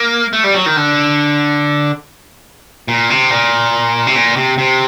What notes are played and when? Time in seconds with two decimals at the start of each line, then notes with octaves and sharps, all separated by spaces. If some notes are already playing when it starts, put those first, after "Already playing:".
Already playing: A#3
0.33 A3
0.44 G3
0.55 F#3
0.66 D#3
0.77 D3
2.88 A#2
3.10 C3
3.31 A#2
4.07 C3
4.15 A#2
4.37 C3
4.58 C3